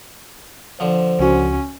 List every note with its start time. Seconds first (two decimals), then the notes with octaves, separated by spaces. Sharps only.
0.80 D3 F3 C5
1.19 C#2 C#4 F#4